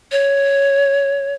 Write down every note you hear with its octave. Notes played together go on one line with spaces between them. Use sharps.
C#5